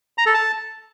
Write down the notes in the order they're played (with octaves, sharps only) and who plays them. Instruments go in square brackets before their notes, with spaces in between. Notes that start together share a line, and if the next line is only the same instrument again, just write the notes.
[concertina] A#5
A4
A5